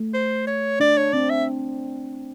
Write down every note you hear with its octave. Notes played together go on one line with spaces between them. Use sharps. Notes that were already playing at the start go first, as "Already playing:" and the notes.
Already playing: A3
C5
C#5
D4 D5
C#5
C4 D5
E5